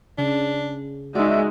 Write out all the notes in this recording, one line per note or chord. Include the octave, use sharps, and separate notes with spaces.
C#3 D4
G#3 D#4 F#4 D5 E5